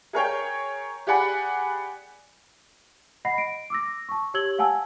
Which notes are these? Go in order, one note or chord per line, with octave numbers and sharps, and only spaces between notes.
G#4 A#4 C#5 G5
G4 G#4 D5 F#5 G#5 B5
D#5 F#5 B5 A#6 C7
D7
D6 E6 A#6
A5 C#6
G4 C#5 E6 G#6 F#7 G7
F5 F#5 G#5 A5 E6